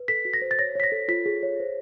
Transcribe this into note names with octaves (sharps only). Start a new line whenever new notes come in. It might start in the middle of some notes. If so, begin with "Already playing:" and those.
Already playing: B4
A4 B6
F#4
A#6
C5
A6
C#5 A#6
C#5 B6
A#6
A4
F4 B6
G#4
C#5
C5